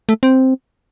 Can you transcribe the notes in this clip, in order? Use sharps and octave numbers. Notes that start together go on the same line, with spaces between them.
A3
C4